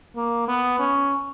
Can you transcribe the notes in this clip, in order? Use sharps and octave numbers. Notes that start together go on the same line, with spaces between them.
A#3
B3
C#4